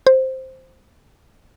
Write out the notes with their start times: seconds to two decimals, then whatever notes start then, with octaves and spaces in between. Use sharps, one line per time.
0.07 C5